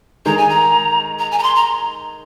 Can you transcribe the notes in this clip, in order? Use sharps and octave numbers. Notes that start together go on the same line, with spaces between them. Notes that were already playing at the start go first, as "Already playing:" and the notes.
D#3 G#3 A#5
G#5
A#5
A#5
G#5
A#5
C6
A#5